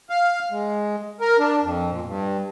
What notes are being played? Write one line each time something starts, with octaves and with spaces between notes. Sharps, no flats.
F5
G#3
A#4
D4
F2
A#2
G2